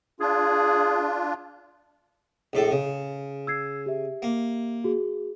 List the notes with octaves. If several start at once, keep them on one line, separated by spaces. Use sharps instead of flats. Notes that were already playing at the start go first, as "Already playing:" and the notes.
D4 F4 G#4
A#1 A2 A4
C#3
E6 G#6 C7
G4 E5
A#3
F#4 G#4